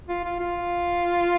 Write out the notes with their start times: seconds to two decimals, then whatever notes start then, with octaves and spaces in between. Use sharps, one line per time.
0.08 F4
0.25 F4
0.40 F4